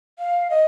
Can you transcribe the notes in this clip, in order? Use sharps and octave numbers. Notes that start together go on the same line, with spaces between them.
F5
D#5